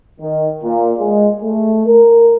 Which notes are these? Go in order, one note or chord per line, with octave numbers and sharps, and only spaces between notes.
D#3
A#2
G#3
A3
A#4